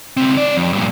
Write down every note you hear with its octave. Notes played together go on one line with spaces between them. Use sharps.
C#2 C4
D#4 D5
F2
G2 A#2